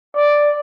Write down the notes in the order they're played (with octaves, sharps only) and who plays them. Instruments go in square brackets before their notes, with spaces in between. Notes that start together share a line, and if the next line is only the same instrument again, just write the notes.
[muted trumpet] D5